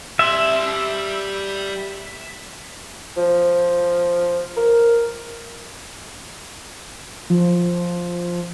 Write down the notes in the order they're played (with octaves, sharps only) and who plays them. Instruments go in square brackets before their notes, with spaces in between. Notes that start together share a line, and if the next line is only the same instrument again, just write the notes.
[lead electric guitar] G3 C6 [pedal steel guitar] E5
[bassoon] F3
A#4
[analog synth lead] F3